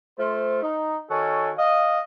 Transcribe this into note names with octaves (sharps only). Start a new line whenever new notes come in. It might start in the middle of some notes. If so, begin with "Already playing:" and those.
A3 F4 C5
D#4
D#3 F#4 A4 C#5 G#5
D#5 F5